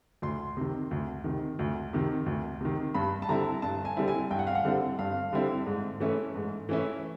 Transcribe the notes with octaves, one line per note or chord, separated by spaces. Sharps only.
D2 C6
C3 D#3
D2
C3 D#3
D2
C3 D#3
D2
C3 D#3
G2 B5
A5
D3 G3 C4 E4 A#5
G2 A5
G#5
D3 G3 C4 E4
G#5
G2 G5
F#5
F5
F#5
D3 G3 C4 E4
G2 F5
D3 G3 C4 E4
G#2
E3 A3 C#4 E4
G#2
E3 A3 C#4 E4